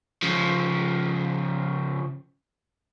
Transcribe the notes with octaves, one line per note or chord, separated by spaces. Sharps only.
C#3 F3